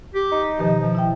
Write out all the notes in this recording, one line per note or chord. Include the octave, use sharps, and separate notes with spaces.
G4
D#4
B2 D#3 F3 G4
F3
E4 E5 G5